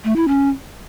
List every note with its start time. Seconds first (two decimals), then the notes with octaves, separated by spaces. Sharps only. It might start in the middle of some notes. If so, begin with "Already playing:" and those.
0.04 A3
0.16 E4
0.28 C#4